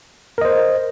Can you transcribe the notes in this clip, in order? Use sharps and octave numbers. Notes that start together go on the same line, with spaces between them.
A#4 C5 D#5